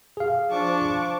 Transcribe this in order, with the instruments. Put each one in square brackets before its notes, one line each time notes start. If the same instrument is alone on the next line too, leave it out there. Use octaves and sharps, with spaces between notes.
[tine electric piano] G#4 F5
[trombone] F3 [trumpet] D4 [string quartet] A5 C#6 D6